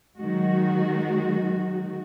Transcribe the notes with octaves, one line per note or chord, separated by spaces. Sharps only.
D#3 F#3 G#3 F#4